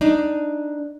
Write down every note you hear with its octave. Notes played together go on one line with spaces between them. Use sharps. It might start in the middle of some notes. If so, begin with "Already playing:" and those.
D4 D#4